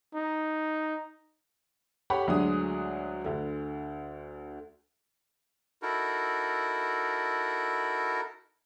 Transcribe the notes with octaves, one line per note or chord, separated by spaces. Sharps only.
D#4
G4 A4 C#5 F#5 B5
D2 F#3 G#3 D4 G#4 D#6
D2 D3
D#4 E4 F#4 A4 A#4